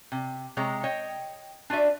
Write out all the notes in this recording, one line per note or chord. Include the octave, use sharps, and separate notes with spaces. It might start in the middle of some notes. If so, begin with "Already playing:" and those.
C3
C3 G#3 C#5 A#5
C#5 D#5 G5
D4 F4 F#4 D5 E5